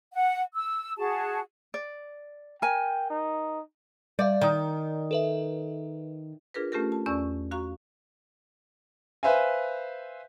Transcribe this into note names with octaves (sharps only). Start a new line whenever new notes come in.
F#5
E6
F#4 G#4 A5
D5
A#4 G5 G#5
D#4
G3 D5 E5 F5
D#3 D5 D#6
A4 B4 E5
D4 F4 G#4 A#4 B4
A3 C#4 F4 G4 A4 A#4
A5
E2 C#4 D5 C#6 E6
F#4 F5 A#5 C#6
B4 C5 E5 F5 G#5